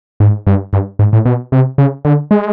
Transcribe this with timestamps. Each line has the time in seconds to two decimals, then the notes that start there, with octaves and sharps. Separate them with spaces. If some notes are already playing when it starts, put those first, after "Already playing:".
0.20 G#2
0.47 G2
0.73 G2
0.99 G#2
1.13 A2
1.25 B2
1.52 C3
1.78 C#3
2.05 D3
2.31 G#3